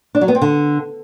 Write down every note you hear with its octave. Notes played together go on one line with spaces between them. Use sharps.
D4
F#3
B3
C4
D3